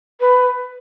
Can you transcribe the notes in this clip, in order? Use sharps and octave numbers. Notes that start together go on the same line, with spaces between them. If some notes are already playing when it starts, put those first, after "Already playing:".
B4